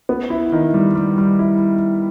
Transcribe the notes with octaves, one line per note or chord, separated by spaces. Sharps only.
B3
E4
D#3
G3
G3
G3
E4